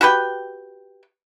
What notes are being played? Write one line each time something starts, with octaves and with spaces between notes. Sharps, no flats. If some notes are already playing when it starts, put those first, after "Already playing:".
F#4 G4 B4 G5